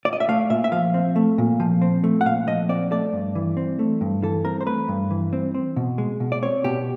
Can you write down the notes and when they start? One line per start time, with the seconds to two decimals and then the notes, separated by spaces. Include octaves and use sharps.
0.05 D5
0.13 D#5
0.20 E5
0.29 A3 F5
0.50 A#2 E5
0.64 E5
0.72 F3 F5
0.94 C4
1.16 A3
1.38 A#2
1.60 F3
1.82 C4
2.04 A3
2.21 F#5
2.25 A#2 F5
2.47 F3 D#5
2.69 C4 D5
2.92 A3 D5
3.13 G2
3.35 E3
3.57 C4
3.79 A3
4.01 G2
4.23 E3 A4
4.45 C4 A#4
4.61 C5
4.66 A3 B4
4.88 G2
5.11 E3
5.33 C4
5.54 C4
5.77 B2
5.98 G#3
6.20 B2
6.32 D5
6.42 C4 C#5
6.64 B2 G4